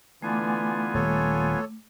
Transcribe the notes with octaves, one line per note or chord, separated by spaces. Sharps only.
D3 E3 A3 B3 F4 G#5 D6
D#1 A4 C#5